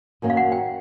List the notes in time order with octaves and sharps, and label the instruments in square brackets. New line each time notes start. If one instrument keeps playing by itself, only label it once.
[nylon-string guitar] F#2 D#3 F#3 A#3
[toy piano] F5
F#5
G5